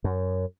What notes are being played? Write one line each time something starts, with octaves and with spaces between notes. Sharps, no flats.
F#2